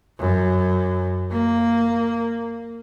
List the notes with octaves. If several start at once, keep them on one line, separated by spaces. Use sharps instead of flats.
F#2
A#3